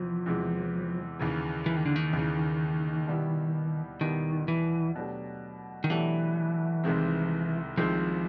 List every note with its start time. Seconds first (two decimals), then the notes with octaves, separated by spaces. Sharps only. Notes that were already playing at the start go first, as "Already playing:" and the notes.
Already playing: E2 C3 E3 F3
0.26 E2 C3 E3 G#3
1.19 D#2 C#3 E3
1.66 E3
1.76 D#3
1.86 D3
1.96 D#3
2.13 D#2 C#3 E3
3.07 B2 G3 B3 E4 G4
4.01 B2 D#3 G3 B3 E4 G4
4.48 E3
4.95 B2 F#3 A3 D4 G4
5.84 D#3
5.90 B2 E3 F#3 A3 D4 G4
6.84 C2 C3 D#3 G#3 C4
7.78 C2 C3 D#3 F3 G#3 C4